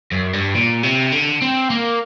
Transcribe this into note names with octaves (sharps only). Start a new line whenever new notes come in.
F#2
G2
A#2
C3
D3
C4
A#3